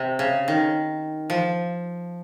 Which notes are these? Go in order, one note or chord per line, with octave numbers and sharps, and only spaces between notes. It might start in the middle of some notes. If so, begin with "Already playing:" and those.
Already playing: C3
C#3
D#3
F3